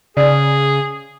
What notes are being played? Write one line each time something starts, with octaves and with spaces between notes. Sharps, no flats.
C#3 G#4 D5